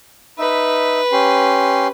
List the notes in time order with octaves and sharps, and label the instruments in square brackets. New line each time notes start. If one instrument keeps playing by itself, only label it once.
[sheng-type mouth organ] D#4 E5 [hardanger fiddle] B4
[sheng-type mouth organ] C#4 G4 C6